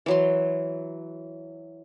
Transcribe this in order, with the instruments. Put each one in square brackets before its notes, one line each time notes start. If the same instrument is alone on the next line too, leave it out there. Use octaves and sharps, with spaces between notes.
[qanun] E3 F#3 C6